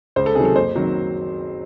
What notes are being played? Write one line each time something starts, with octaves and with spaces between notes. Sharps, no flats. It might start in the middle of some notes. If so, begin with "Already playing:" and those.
C#2 C5
A4
C3 D#3 F#3 G#4
A4
F#1 C5
D#3 F#3 C4